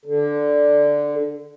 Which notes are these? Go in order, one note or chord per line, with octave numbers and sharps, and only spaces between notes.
D3